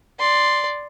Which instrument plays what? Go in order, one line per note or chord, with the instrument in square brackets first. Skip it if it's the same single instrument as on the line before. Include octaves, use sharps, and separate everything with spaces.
[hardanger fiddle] D5 C6